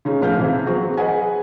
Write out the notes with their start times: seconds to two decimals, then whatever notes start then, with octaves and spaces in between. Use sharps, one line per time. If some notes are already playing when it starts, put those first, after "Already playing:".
0.05 C#3 G#3 C#4 D#4
0.21 A2 F3 B4 F5 F6 G6
0.37 C3 E3 C4
0.66 F#3 C4 F#4 G#4
0.97 G#4 B4 D#5 F#5 G#5